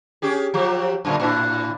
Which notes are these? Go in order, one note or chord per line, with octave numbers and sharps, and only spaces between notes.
C#4 G4 G#4
F3 F#3 G4
F#2 A#2 D3
A2 D4 E4